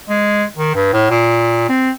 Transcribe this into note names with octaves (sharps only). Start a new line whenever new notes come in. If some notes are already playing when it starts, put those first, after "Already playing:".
G#3
D#3
G2
A2
A#2
C4